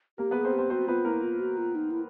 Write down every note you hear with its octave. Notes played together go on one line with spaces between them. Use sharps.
A#3 G4 A#4
B3 G#4 B4
C4 C5
G4
C4 C5
C4 F#4 C5
B3 F4 B4
A#3 E4 A#4
F4
F#4
F4
D#4
E4